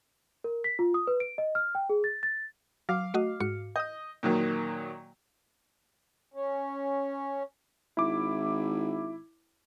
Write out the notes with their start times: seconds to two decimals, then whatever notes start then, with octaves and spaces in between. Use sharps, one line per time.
0.44 A#4
0.64 B6
0.79 F4
0.94 D#6
1.07 B4
1.20 D7
1.38 D#5
1.55 F6
1.75 G5
1.90 G#4
2.04 A6
2.23 A6
2.89 F#3 F5 D6
3.14 A3 F#4 D#5
3.40 G#2 F#4 C#7
3.76 D#5 D#6 G6
4.23 A#2 D#3 F#3
6.34 C#4
7.97 G#1 E4 D6